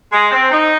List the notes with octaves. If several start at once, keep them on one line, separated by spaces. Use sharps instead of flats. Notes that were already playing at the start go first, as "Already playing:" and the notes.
G#3
C4
D#4